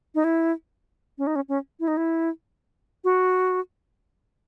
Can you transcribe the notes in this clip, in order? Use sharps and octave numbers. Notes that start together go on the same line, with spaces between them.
D#4
E4
C#4
D#4
C#4
C#4
E4
D#4
E4
F#4